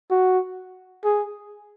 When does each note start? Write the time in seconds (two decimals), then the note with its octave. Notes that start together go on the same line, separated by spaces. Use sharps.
0.11 F#4
1.04 G#4